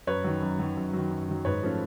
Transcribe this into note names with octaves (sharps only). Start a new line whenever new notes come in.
F#2 B4 C#5
D#3 F#3
F#2
D#3 F#3
F#2
D#3 F#3
F#2
D#3 F#3
G#2 B4 C#5
F3 A3 C#4